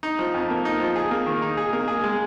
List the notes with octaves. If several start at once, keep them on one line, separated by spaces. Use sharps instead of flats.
D#4
F3
F2
A#3
D#4
F3
G#4
A#3
D#3
D#4
G#4
A#3
G#4
G#3